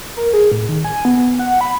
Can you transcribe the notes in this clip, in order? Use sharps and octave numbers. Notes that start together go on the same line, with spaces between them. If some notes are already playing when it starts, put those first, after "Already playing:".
A#4
G#4
A2
D#3
G#5
B3
F#5
B5